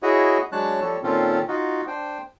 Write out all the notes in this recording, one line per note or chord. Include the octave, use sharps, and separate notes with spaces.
E4 F#4 G#4 C#5 D#5
F#3 G#3 D4 C#5 A5 F#6
F3 G3 A4 C#5
A#2 D#3 C4 C#4 F4 A4
D#4 F4 F#4
D4 C5 G5